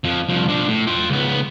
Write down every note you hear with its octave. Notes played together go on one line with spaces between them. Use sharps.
F2 F3
C2 F3
F3 D4
A2
F4 G5
C#2 B3